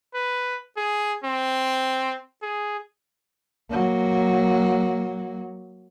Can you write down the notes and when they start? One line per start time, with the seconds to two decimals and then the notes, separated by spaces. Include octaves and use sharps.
0.15 B4
0.77 G#4
1.24 C4
2.43 G#4
3.70 F#3 A#3